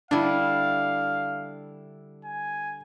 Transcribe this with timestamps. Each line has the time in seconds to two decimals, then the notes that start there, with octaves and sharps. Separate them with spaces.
0.11 D3 G3 D4 E4 F5
2.25 G#5